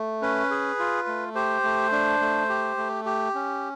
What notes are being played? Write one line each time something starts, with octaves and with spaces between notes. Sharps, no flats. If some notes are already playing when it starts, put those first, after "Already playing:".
Already playing: A3
C#4 B4
G#4
F4
A3
G4 C5
A3
D4
A3
G4
A3
G4
C#4